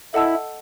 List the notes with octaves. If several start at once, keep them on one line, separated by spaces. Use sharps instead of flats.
E4 A4 D#5 F#5 A5 E6